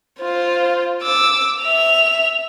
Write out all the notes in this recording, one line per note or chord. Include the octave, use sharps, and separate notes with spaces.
F4 C5
D6 E6
E5 F7